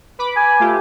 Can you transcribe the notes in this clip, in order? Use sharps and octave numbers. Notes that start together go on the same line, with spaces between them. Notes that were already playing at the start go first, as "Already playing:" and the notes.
B4 B5 D6
G#5
A3 F4 G4